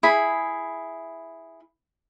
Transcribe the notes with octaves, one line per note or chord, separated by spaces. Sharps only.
E4 G#4 B5